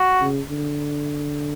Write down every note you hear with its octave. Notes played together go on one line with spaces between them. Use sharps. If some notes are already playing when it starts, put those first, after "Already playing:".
Already playing: F#4
C#3
D3